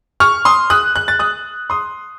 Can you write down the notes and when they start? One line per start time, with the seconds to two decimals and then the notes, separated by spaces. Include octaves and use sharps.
0.20 C#6 F6
0.45 C6 D#6
0.70 D#6 F#6
0.96 F#6
1.08 A6
1.19 D#6 F#6
1.70 C6 D#6